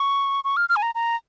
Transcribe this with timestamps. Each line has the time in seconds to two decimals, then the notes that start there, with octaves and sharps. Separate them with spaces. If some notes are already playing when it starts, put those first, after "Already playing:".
Already playing: C#6
0.44 C#6
0.57 F6
0.69 F6
0.76 G#5
0.82 A#5
0.95 A#5